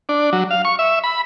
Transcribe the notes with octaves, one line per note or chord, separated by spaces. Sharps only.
D4
F#3
F5
C#6
E5
B5